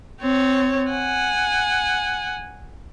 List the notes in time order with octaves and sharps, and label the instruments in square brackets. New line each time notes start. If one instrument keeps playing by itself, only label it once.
[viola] C4 C#5
F#5 G#5